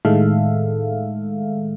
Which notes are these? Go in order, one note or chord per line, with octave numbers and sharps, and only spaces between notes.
A2 D#3 G#3 A4 E5 F5